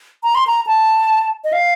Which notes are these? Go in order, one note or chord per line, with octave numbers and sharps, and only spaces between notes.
A#5
C6
A#5
A5
D#5
F5